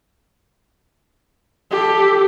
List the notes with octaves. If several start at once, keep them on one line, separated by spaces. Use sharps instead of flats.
G4 A4